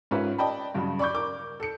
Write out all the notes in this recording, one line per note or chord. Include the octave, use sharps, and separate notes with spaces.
G#2 C#4 F4 A#4 B4 E5
D5 D#5 G5 A5 B5
G2 C#3 F#3
D5 B5 C#6 D6 G6
A#4 D6
A4 C#7